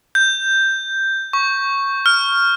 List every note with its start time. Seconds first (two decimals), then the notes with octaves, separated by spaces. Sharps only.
0.15 G6
1.33 C#6
2.06 F6